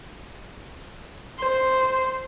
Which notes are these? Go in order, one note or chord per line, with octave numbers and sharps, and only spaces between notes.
C5